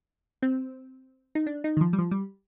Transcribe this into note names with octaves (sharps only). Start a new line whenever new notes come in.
C4
D#4
D4
D#4
D#3
F3
G3
F3
G3